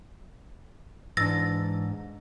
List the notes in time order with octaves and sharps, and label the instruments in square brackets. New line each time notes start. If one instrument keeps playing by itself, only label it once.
[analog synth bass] G#2 [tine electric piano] E3 D4 [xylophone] E6 A6 A#6